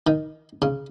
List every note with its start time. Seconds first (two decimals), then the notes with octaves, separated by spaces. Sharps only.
0.07 D#3
0.62 C#3